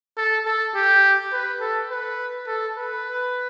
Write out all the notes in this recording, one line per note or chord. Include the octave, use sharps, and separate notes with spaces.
A4
A4
G4
B4
A4
B4
A4
B4